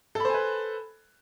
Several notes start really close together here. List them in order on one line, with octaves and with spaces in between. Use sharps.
A4 B5 C5 G#5 B4